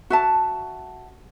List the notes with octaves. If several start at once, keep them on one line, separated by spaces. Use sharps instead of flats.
F#4 E5 A5